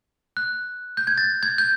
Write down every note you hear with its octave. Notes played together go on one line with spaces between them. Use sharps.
F#6
G6
G#6
A6
G#6
G6